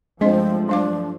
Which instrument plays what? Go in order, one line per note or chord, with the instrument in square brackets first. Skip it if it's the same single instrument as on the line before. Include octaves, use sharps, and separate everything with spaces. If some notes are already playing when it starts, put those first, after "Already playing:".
[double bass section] G2 F3 A3 [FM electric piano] G#3 [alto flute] C4 [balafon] D4 D#5 C6
[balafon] F#3 F5 D6 [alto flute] D4